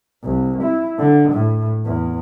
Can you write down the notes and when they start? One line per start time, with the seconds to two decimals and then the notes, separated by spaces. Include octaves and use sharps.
0.24 C2
0.62 E4
0.99 D3
1.32 A2
1.86 E2